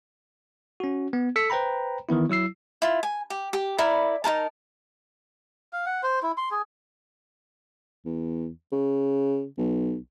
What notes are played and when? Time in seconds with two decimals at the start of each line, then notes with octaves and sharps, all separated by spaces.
0.80 C#4 F#4
1.13 B3
1.36 A4 E6 B6 C#7
1.50 B4 C5 G5 A#5 B5
2.09 D#3 E3 B3 E4
2.30 F#3 E4 E6 C7
2.82 E4 F4
3.03 G#5
3.30 G4
3.53 G4
3.78 E4 A#4 D5 B5
4.24 D#4 E4 A#4 A5
5.73 F5
5.86 F#5
6.03 C5
6.23 E4
6.38 C6
6.51 G#4
8.05 E2
8.72 C#3
9.58 B1